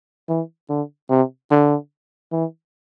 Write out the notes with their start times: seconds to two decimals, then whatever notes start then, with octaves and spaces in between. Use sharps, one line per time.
0.29 E3
0.69 D3
1.10 C3
1.51 D3
2.32 E3